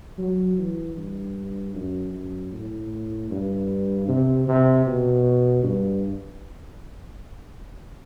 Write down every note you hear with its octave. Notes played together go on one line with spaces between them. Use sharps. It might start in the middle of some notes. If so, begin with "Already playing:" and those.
F#3
E3
G2
F#2
F#2
A2
G2
C3
C3
B2
G2